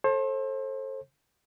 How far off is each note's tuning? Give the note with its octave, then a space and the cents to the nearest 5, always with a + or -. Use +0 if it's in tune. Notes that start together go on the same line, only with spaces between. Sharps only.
A4 +0 C5 +35